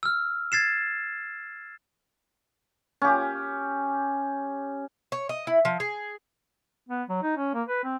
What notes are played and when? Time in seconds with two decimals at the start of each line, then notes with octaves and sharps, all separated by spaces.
0.03 E6 F6
0.52 G#6 A6 C7 E7
3.02 C#4 G4
5.12 C#5
5.29 D#5
5.47 E4
5.65 F3
5.80 G#4
6.89 B3
7.09 F#3
7.23 D#4
7.37 C#4
7.54 A#3
7.68 B4
7.84 C4